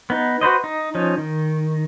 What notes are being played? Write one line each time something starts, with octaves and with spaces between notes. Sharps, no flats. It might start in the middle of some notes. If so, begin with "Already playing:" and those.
B3 D#4
F#4 B4 C5 D#5
D#4
F3 C#4 D#4
D#3